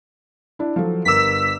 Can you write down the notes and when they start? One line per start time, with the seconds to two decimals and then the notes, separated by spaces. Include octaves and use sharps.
0.59 D4 E4
0.76 F3 F#3 A4
1.05 G1 A#4 D6 E6 B6